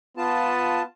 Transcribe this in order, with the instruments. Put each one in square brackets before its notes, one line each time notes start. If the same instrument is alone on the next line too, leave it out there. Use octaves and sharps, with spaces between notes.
[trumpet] B3 [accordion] F4 A5